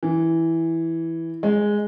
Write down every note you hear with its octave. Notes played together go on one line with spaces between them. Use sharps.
E3
G#3